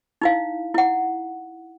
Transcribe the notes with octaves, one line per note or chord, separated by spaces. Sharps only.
D#4 E4 F5
E4 F#5